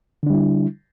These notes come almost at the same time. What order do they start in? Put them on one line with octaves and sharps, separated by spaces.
D3 D4 G3 E4